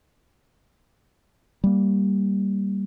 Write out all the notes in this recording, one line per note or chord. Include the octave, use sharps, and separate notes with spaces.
G3 A#3